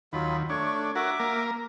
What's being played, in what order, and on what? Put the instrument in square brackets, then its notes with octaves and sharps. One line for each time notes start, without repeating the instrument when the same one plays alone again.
[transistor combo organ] D#2 [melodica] F#3 F4 B5
[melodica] A3 C#5 C#6 [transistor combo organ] D4
[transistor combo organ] F#4 A#4 [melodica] E5 D6
[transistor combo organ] A#3 A#4